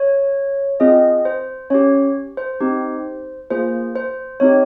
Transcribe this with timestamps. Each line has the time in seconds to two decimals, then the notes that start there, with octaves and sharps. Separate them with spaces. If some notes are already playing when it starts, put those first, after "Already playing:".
Already playing: C#5
0.80 C4 F4 G#4 D#5
1.25 C5
1.70 C#4 G4 C#5
2.37 C5
2.60 C4 D#4 G4
3.51 A#3 F4 G#4 C5
3.96 C5
4.40 C4 D#4 G4 C#5